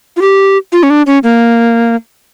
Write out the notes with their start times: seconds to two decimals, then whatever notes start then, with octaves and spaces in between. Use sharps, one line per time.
0.17 F4
0.21 G4
0.72 F4
0.83 C#4
0.90 D4
1.07 C#4
1.23 A#3